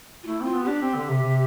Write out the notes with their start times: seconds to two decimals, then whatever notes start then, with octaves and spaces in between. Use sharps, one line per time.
0.23 F4
0.27 A3 E4
0.41 C4 F4
0.55 B3
0.64 D4 G4
0.82 C4
0.95 D3
1.09 C3
1.22 C3